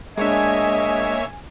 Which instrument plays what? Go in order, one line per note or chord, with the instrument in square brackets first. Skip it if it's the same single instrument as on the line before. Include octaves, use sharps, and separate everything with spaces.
[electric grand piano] G#3 D4 [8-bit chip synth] A#3 C#5 E5 [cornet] D#5 [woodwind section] G#5